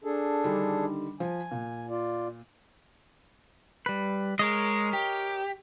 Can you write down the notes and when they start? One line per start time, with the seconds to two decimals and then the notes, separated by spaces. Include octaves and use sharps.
0.04 D4 G#4 A4
0.44 D3 D#3 G3
1.20 F3 G#5
1.51 A#2
1.90 F4 D5
3.86 G3 B4
4.39 G#3 A#4 C#5 D#5
4.93 G4